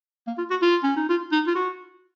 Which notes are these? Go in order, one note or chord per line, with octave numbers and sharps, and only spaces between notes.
A#3
F4
F#4
F4
C#4
D#4
F4
D#4
F4
F#4